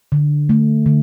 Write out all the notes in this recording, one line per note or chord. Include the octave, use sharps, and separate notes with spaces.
D3
A3
D3